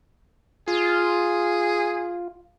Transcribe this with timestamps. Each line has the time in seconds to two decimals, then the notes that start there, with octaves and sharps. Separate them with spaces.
0.68 F4 G#4